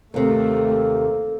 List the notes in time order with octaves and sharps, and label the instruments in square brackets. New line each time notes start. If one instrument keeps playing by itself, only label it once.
[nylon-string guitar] D#2 C3 [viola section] A3 [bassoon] A#3 [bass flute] A4